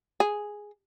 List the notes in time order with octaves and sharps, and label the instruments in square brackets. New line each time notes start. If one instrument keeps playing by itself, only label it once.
[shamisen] G#4